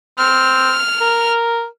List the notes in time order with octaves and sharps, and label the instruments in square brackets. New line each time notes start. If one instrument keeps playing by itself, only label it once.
[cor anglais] C4 [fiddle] F6
[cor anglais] A#4